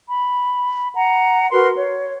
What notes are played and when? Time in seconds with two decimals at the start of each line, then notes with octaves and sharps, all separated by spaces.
0.08 B5
0.95 F#5 A#5
1.51 F#4 A#4 B4 C6
1.75 C#5